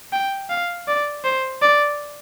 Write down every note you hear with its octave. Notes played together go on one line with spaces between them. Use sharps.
G5
F5
D5
C5
D5